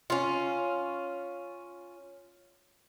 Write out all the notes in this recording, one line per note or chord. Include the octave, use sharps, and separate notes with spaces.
C#4 F4